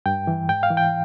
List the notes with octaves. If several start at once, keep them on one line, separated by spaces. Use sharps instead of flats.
G2 G5
E3
G#2 G5
F5
E3
G5